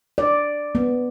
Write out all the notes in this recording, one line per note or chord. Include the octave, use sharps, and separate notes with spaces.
D5
B3